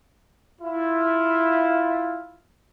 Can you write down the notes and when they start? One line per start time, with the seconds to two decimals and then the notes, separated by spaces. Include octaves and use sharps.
0.61 E4 F4